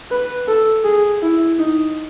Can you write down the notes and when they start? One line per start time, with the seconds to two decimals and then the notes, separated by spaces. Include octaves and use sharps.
0.11 B4
0.48 A4
0.85 G#4
1.22 E4
1.59 D#4